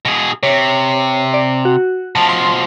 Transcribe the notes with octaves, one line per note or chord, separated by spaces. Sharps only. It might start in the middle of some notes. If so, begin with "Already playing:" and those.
B2 G#4
C3 C#5
D5
F#4
B2 F3 A5
C6